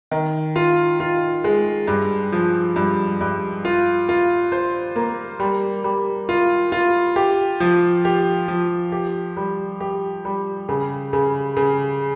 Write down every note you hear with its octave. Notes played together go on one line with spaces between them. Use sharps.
D#3
F4
F4
G#3
G2
F3
G2
G2
F4
F4
C5
A#3
G3
G3
F4
F4
G4
F3
G4
F3
G4
G3
G4
G3
C#3
C#3
C#3